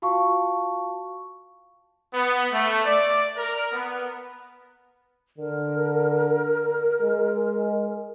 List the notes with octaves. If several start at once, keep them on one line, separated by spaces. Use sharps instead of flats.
F4 F#4 F5 A5 C#6
B3
A3
D5
A#4
B3
D3 A#4
G#3